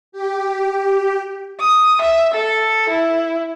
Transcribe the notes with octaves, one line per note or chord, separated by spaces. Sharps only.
G4
D#6
E5
A4
E4